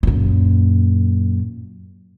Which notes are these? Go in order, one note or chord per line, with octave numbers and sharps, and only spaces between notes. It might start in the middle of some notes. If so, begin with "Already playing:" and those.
F#2 A#2